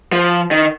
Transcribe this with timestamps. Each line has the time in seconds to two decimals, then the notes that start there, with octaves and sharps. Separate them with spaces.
0.12 F3
0.51 D#3